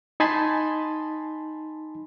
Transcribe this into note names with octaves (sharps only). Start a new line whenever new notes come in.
D#4 G#5 A5 B5 C6